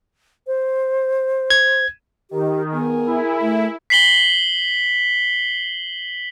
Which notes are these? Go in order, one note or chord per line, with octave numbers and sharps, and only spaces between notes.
C5
G#6
D#3 G4
B3 G#4 A#4
E4
A3
B6 C7 F#7 G7